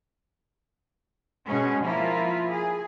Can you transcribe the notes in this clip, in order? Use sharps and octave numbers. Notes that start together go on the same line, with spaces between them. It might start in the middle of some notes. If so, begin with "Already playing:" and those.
B2 G#3 C#4 G#4
F3 A#3 E4 F4
G#4